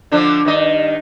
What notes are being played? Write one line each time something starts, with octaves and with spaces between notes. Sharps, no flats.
D3 F3 D4
G2 D#3 D#5